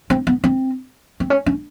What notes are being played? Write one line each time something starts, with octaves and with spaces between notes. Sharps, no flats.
C4
B3
C4
C4
C#4
C#4